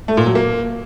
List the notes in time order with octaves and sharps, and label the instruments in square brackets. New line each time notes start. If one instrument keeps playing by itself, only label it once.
[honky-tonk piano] A3
A#2
F#3
A#3